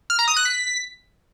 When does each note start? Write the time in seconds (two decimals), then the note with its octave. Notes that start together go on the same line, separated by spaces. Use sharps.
0.10 F6
0.19 A#5
0.28 D#6
0.37 F#6
0.45 B6